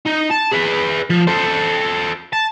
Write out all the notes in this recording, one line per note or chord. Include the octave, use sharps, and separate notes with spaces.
D#4
A5
G#4 B4
F3
A4 C5
A5